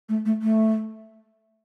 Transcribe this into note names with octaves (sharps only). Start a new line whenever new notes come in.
A3
A3
A3